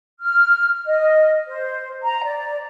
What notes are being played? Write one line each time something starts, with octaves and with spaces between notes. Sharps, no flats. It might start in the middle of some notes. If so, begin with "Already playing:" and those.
F6
D#5
C5
A#5
D5